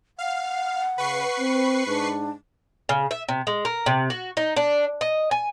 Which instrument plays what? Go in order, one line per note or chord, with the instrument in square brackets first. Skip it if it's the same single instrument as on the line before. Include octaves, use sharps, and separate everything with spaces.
[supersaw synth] F5 [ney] F#5
[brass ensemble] C#3 [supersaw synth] B4 C#6 C7
[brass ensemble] C4
[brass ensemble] G#2 [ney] D4
[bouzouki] C#3
E5
C3
G#3
A#4
C3
F#4
D#4
D4
D#5
G#5